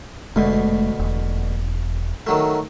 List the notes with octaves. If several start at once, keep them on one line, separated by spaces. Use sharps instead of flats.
F1 D2 B2 G#3 A3
E1
D#3 F#3 A3